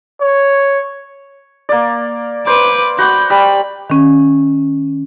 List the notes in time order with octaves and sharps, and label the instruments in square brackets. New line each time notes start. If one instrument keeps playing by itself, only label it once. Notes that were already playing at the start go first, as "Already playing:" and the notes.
[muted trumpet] C#5
[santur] A#3 D5
[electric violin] B4 D6 [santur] C5
[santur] F#4 D6 [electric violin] B5 G6
[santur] G3 [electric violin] B5
[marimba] D#3 C#4